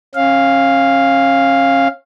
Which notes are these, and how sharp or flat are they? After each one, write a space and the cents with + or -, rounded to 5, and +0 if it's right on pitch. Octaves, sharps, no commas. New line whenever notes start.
C#4 -35 F5 +0